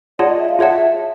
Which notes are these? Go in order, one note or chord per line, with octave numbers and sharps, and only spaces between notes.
F4 G#4 C#5 D5 F#5 A5
D#5
E5
F5
F4 G#4 C#5 E5 F#5 A5